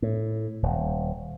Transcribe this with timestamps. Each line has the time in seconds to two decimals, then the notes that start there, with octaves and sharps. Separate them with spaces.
0.02 A2
0.63 D#1